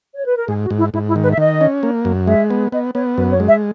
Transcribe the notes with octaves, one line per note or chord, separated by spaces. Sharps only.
C#5
B4
A#4
G#2 G#4
F#4
G#2
E4
G#2 E4
E4
D#3
B4
E5
D#3 D#5
C#4
A#3
F#2
G#3 E5
B3
B3 D#5
B3 C#5
F#2 B4
C#5
G#3
E5